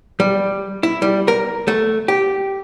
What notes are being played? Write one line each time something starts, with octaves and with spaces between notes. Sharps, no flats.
G3
E4
G3
A#4
A3
G4